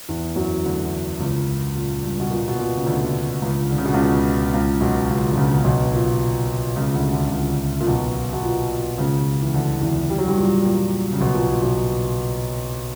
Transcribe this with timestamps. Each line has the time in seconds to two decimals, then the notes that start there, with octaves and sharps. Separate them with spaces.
0.09 E2 E3
0.36 F#2 F#3
0.64 D2 D3
1.20 C#2 C#3
1.75 A#2
2.03 G2
2.20 B2
2.31 A#2
2.48 B2
2.59 A#2
2.76 C#3
2.86 D2 D3
3.42 C#2 C#3
3.70 D3
3.78 C#3
3.85 B2
3.94 C#2 C#3
4.54 C#2 C#3
4.81 B1 B2
5.09 C#2 C#3
5.31 D3
5.37 C#2 C#3
5.58 C#3
5.64 B1 B2
5.93 A#2
6.76 C#2 C#3
6.94 D2 D3
7.12 D2 D3
7.26 D3
7.31 C#2 C#3
7.80 A#2
7.87 B1 B2
8.33 B2
8.43 A#2
8.98 C#2 C#3
9.42 E3
9.54 D2 D3
9.81 E2 E3
10.10 G3
10.18 F#3
10.27 G2 G3
10.37 A#2
10.65 A#2
11.12 C#3
11.20 B1 B2
11.34 A#2
11.49 A#2
11.62 B1 B2